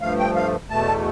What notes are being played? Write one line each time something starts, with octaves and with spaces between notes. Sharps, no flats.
G2 F3 A3 F5
G5
F5
E2 B2 A3 A5